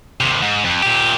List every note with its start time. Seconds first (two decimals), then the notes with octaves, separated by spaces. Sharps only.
0.21 D#2 C3
0.42 G#2
0.65 F2
0.83 A#2 G4